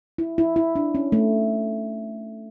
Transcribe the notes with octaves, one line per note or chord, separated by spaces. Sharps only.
E4
E4
E4
D4
C#4
A3